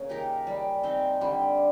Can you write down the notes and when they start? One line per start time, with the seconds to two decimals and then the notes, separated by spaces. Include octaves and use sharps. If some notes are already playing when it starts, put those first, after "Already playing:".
Already playing: C#3 A#3
0.09 D#4 G4 A#4
0.47 G3
0.83 C4 D#4
1.21 D3 G3